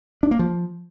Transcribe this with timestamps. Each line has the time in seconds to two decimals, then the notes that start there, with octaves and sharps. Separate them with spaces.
0.23 D4
0.31 A#3
0.39 F3